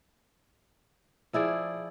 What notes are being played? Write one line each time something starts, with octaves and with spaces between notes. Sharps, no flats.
F3 E4 G#4 D5